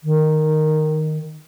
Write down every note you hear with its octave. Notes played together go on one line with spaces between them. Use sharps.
D#3